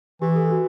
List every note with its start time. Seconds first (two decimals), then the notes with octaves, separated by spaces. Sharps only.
0.22 E3 G4
0.36 A4
0.51 F#4